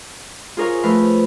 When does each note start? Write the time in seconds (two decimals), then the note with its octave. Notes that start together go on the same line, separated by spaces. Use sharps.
0.57 F4 G#4 A#4 C#5 F5
0.83 F3 A3 B4 F5